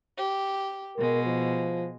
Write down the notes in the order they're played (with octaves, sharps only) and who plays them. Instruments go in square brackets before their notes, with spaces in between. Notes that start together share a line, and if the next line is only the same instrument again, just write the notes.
[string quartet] G4
[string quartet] B2 G#3 [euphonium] A#4
[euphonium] F3